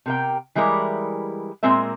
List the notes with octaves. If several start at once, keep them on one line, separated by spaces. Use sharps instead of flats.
C3 A#4 G5
E3 G3 G#3 E4 A#4
A#2 G#3 C4 A#4 E5